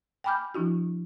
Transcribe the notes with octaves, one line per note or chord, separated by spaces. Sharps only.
G5 G#5 B5 D6 F6 G6
F3 D4 E4 F#4